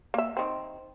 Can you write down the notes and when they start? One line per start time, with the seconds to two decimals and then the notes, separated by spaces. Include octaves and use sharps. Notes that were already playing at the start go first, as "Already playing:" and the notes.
0.14 A#3 E5
0.37 D#3 C4